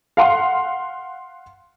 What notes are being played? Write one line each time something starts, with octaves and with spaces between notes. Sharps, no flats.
F5 F#5 C6